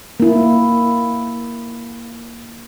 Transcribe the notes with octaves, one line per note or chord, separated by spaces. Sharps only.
A#3 E4